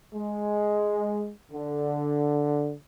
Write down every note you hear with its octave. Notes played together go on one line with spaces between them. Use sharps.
G#3
D3